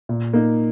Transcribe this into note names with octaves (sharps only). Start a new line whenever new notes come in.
A#2
A#3 D#4